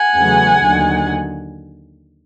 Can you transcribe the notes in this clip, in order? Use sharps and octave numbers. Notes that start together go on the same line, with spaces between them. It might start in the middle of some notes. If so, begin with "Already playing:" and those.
Already playing: F#5 G#5
E2 C#3 F#3 A3
D#2 D3 F#3